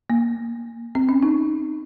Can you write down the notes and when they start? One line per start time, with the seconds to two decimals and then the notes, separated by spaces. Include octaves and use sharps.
0.10 A#3
0.95 C4
1.09 C#4
1.23 D#4